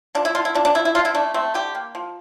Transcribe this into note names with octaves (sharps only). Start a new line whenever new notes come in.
F3 D4
E4
D3 F4
E4
F3 D4
D4
F3 E4
E4
D3 F4
E4
A3 D4
A3 C4
D3 G4
A#3
F3